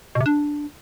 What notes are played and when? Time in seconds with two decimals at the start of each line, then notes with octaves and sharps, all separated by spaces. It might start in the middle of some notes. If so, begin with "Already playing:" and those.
0.15 B2
0.20 C3
0.26 D4